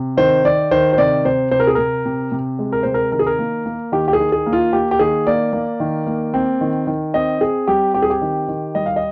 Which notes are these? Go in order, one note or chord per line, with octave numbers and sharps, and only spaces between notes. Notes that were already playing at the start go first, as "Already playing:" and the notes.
Already playing: C3
D#3 C5
D#3 D5
D#3 C5
C5
C3 D5
C3 C5
C3 C5
A#4
G#4
C3 A#4
C3
C3
G#3
A#4
C3 C5
A#4
D#3 A#4
G#4
A#4
A#3
A#3
D#3 G4
G4
G#4
D#3
G#4
A#3
F4
A#3 G4
G4
D#3 G#4
A#3 D5
A#3
D#3
A#3
C4
D#3
D#3
C4 D#5
C4 G#4
G3 G4
C4 G4
G#4
G4
D#3
D#3
G3 D#5
F5
D#5